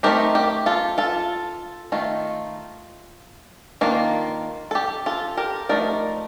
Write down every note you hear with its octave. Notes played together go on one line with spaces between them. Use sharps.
A3 C4 D#4 G4 A#4
G4
F4 A4
F4 A4
D#3 A3 D#4 F4
D#3 A#3 D4 F4
A4
G4
F4 A4
G4 A#4
F3 A3 D#4 A#4 D5